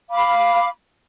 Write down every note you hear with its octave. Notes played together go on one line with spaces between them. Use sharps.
F5 B5 D6